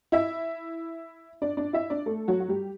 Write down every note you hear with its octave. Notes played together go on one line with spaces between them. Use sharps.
E4 E5
D4 D5
D4 D5
E4 E5
D4 D5
A3 A4
F#3 F#4
F#4
G3 G4